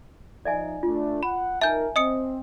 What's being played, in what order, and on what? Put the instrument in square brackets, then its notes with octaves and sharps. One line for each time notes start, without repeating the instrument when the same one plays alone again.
[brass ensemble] F3 D#4 [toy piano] D5 E5 G#5
[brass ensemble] A3 D4 [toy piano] F4
[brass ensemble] F#5 [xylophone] B5
[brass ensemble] D#4 A#4 [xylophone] E5 G6 [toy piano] G#5 A5
[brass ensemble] C4 [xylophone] D#5 D#6 C#7